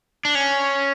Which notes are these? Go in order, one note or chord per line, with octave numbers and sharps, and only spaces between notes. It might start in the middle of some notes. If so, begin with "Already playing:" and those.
D4
C#4